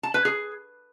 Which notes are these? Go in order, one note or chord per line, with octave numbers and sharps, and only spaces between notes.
A5
B4
G#4